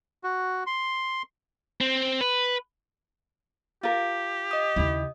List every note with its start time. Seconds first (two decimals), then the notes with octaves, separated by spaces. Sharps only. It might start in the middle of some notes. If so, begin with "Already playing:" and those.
0.24 F#4
0.67 C6
1.81 C4
2.21 B4
3.83 F4 G4 A#4
4.51 D#5 D#6
4.76 D#2 C#3 E4